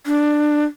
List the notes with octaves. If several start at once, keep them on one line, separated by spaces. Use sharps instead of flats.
D4